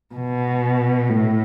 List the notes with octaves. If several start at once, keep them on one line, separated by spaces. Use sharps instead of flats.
B2
A2